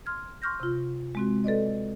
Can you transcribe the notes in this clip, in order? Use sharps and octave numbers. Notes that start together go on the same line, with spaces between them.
C6 F6 G#6
C6 C#6 F6 G6 A#6
C3 F4
G#3 C4 F#4
A4 B4 D5 D#5